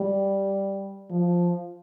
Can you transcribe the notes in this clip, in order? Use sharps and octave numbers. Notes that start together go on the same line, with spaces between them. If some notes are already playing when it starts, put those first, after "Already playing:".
Already playing: G3
F3